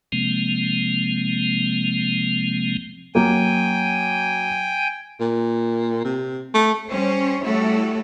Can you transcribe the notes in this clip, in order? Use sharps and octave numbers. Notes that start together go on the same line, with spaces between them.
C3 F3 G#3 A#3 C4
F#2 A#3 G5 G#5
A#2
C3
A3
G3 C#4 C5 C#5
G3 A3 E4 F#4 A4 C#5